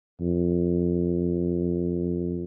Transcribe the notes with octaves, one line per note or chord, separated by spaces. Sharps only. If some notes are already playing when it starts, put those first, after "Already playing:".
F2